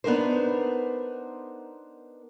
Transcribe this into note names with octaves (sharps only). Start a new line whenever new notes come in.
B3 D4 D#4 A#4 C5